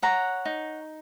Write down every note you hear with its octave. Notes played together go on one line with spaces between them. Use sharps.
C#5 F#5 A#5
D#4